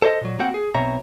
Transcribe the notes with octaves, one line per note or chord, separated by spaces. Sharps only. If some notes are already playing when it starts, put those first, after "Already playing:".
A4 C5 C#5 D#5
A#2 F#3
A#3 C4 F#4 F#5 G5
G#4
B1 B2 C4 C#5 E5 A#5